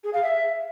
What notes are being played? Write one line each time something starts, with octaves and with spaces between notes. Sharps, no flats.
G#4
F5
E5